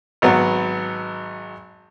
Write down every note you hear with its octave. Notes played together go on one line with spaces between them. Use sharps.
G#1 F#3 B3